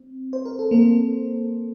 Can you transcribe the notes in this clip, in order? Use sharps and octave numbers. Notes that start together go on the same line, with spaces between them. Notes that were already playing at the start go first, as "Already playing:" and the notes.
Already playing: C4
C5
A#4
A4
A#3 A#4